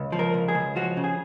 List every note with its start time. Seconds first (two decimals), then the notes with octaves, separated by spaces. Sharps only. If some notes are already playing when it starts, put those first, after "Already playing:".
Already playing: C#2
0.12 F3
0.19 A#4
0.34 C#2
0.48 G#4
0.55 C#2
0.76 F3 F#4
0.97 C#3
1.04 G#4